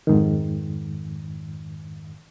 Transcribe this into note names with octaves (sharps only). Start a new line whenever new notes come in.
F2 G#2 D#3